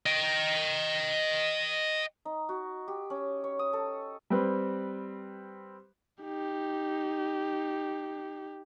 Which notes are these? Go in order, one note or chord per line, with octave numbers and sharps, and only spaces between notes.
D#5 G5
D#4
F#4
G4
C#4
C#5
D#6
A4
G3 C4 B4
D#4 G4